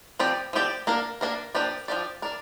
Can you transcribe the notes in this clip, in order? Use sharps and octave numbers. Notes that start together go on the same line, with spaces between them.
F3 C4 G4 D5
F3 C4 G4 D5
A#3 D4 A#4
A#3 D4 A#4
F3 A#3 D4 G4 D5
F3 A#3 D4 G4 D5
D4 A#4 D5